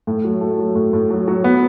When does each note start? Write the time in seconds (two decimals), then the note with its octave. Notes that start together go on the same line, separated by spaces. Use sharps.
0.07 A2
0.24 F#3
0.41 A3
0.59 F#3
0.75 A2
0.93 A2
1.10 F#3
1.28 F#3
1.44 B3